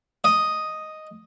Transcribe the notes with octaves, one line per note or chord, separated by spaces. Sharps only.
D#5